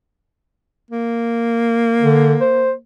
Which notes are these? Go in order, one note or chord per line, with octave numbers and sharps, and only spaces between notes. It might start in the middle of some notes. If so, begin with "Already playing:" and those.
A#3
D3
C5